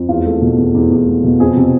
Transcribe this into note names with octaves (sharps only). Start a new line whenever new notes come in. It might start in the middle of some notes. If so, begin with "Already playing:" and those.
Already playing: F2
E2 F4
A3
B2
E2
E2
E2
A3
B2
F2 G#4
C3